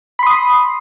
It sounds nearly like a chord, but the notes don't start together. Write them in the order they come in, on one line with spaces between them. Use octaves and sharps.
B5 C6 D#6 C7